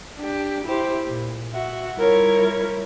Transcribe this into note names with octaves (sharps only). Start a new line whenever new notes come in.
D4 G4
E4 G4 C5
A#2
F#4 E5
G3 E4 F4 A#4 C#5